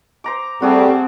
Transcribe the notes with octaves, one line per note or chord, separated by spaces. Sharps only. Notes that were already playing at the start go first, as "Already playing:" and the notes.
C5 A#5 D6
G3 A3 C4 F#4 G#4 A5